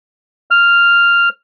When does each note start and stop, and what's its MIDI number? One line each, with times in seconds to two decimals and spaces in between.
0.51 1.29 89